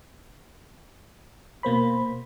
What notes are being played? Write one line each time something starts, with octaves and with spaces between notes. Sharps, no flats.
B2 A#3 C5 B5